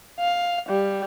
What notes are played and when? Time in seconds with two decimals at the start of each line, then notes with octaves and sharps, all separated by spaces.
0.19 F5
0.68 G3